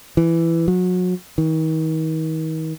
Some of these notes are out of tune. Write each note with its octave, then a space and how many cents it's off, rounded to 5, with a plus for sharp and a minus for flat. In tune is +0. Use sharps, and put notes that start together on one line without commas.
E3 +10
F#3 -30
D#3 +40